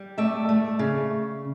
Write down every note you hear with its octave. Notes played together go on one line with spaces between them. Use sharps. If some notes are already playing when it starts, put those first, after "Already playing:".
Already playing: G3
A3 D5 E5
A3
C#3